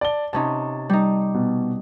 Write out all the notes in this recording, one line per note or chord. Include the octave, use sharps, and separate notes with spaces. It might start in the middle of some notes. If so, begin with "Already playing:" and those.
D5 A5 G7
C3 C#4 D#4 A5
G3 D#4
B2